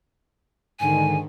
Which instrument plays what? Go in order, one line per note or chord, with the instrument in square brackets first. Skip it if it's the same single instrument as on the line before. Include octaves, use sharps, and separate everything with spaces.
[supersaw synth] G#2 D3 D#3 [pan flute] G#5